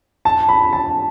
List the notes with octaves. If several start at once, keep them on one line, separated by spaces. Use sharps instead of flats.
A5
B5
A5